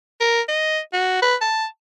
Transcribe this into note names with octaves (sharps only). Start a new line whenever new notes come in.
A#4
D#5
F#4
B4
A5